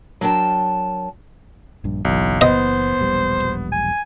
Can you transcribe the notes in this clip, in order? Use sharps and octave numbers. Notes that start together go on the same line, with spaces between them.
F#3 D4 A#4 G5 A5
A#1 G2
F#1 B1 E3
B3 C5 D#5
E1 A#1 G3
G#5